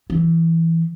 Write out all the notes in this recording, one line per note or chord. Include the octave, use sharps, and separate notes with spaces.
E3